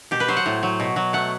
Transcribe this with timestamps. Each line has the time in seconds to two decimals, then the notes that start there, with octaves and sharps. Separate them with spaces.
0.11 B2 G4
0.20 B4
0.28 F#3 C5
0.37 F#5
0.46 A2
0.63 F#3
0.80 B2
0.96 F#3
1.13 A3 F#5